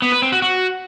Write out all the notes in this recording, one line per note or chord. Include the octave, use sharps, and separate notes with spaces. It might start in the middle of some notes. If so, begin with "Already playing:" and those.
B3
B4
C4
F#4
F#4